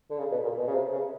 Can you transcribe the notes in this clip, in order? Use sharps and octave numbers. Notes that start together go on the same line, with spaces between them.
D3
C#3
B2
A#2
B2
C#3
C3
C#3